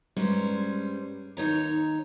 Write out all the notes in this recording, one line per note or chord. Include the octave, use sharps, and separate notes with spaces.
G2 G3 G#3 C#4 C5 A#5
D#2 D#4 C#5 A#5